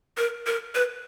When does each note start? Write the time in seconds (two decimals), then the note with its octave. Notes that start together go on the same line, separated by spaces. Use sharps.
0.17 A#4
0.47 A#4
0.75 B4